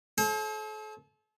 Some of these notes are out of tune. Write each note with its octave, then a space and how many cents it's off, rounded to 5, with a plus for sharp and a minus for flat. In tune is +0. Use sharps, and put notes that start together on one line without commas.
A4 -40 C5 +40